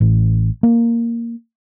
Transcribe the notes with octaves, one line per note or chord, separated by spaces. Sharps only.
A1
A#3